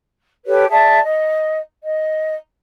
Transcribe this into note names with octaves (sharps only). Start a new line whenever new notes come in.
G4 A4 B4 C#5
G#4 D5 E5 A5
D#5
D#5